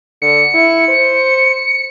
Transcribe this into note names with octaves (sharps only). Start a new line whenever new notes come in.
D3 C#7
E4
C5